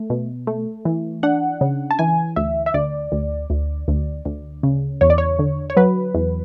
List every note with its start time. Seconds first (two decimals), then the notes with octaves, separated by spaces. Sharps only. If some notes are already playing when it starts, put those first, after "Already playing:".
Already playing: A3
0.10 B2
0.47 A3
0.85 E3
1.23 D4 F#5
1.61 C#3
1.91 A5
1.99 E3 G#5
2.36 D2 E5
2.66 E5
2.74 D2 D5
3.12 D2
3.50 D2
3.88 D2
4.25 D2
4.63 C#3
5.01 E2 C#5
5.10 D5
5.18 C#5
5.39 D3
5.70 C#5
5.77 F#3 B4
6.15 E2